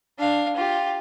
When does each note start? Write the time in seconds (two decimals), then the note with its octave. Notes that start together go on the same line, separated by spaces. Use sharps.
0.18 D4 F5
0.56 F4 G4